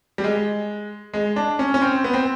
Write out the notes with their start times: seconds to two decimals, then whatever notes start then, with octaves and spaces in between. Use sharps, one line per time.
0.18 G3
0.24 G#3
1.14 G#3
1.36 D4
1.59 C#4
1.74 C#4
1.82 C4
2.04 B3
2.13 C4